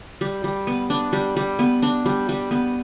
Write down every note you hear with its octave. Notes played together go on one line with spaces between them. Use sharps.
G3
G3
B3
D4
G3
G3
B3
D4
G3
G3
B3